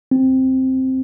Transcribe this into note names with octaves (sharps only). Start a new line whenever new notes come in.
C4